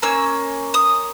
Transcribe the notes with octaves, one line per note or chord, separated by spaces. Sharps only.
A#3 C#4 E6
D#6